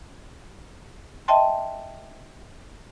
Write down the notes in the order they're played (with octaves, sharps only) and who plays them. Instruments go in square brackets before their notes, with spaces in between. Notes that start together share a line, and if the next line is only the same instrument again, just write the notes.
[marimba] D#5 E5 G5 A5 C6